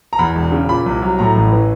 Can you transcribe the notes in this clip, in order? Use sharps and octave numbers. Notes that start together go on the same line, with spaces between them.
A#5
E2 B5
E1
C#3
A#2 B5
C2
F#3
A2 A#5
A1
E3